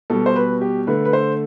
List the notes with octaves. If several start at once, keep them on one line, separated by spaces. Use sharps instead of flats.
B2 G3 A4
C5
B4
G4
D3 A3 B4
B4
C5